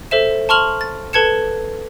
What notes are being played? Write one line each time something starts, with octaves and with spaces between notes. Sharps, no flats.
A4 C5 E5 E7
A5 C6 C#6 F6 F7 F#7
A6
A4 B4 A5 G#6 C#7 E7